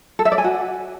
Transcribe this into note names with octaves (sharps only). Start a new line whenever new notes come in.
A4
E5
D5
G#5
F#4